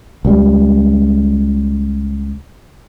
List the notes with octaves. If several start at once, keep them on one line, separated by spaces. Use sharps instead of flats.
C#2 G3